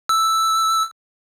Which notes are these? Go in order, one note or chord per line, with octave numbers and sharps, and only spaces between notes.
E6